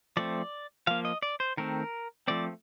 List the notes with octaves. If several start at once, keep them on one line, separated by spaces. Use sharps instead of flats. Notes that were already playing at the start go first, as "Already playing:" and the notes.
F3 A3 C4 D5
F3 A#3 F5
D#5
D5
C5
D#3 A3 C4 A#4
F3 A3 C4 D5